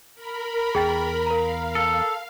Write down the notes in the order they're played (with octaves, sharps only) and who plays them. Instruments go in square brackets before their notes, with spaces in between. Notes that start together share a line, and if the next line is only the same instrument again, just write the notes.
[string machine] A#4 B5
[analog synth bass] E2 [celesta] G#4 G5 A6
[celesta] A#4 A#5 [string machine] F5
[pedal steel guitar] A4